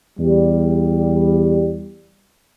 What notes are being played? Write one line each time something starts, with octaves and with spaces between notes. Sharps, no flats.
E2 G3